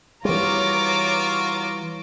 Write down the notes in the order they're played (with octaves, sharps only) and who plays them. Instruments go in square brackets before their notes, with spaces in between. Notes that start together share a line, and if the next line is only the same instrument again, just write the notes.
[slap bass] E3 G3 [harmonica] B3 F4 F#4 [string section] C#5 A#5 D6